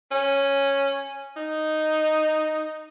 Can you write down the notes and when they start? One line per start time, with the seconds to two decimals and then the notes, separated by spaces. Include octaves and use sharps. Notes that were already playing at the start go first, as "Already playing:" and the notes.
0.11 C#4
1.36 D#4